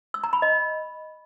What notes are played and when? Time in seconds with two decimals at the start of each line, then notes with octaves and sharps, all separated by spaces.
0.14 E6
0.24 A#5
0.33 B5
0.42 D#5